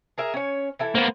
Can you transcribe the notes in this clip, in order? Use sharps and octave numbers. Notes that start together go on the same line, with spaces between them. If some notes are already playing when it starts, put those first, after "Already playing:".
G#4 A#4 E5
C#4 C#5
E3 E4 A4
A#3 B3 C5